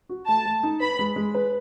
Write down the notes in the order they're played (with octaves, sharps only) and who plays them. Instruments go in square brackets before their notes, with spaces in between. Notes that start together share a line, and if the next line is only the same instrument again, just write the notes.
[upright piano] F#4
[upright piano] A3 [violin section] A5
[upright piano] A3
D#4
[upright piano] B4 [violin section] B5
[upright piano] G#3
G#3
B4